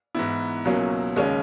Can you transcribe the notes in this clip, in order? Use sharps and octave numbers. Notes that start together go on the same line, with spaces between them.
G#2 E3 B3 E4
C#2 B2 F#3 A#3 C#4
D#2 C#3 G#3 C#4